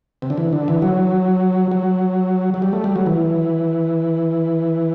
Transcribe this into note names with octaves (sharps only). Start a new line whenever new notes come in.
C3
D3
E3
D3
E3
F#3
F#3
F#3
G3
A3
G3
F#3
E3